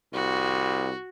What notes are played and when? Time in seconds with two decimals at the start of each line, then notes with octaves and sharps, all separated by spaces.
0.13 C2 F#4